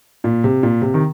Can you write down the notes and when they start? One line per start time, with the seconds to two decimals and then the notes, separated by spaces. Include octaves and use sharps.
0.24 A#2
0.44 C3
0.63 A#2
0.82 C3
0.94 D#3